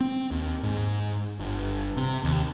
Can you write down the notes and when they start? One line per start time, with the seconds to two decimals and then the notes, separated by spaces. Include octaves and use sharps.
0.01 C4
0.31 D#2
0.63 G#2
1.39 G1
1.97 C3
2.24 D#2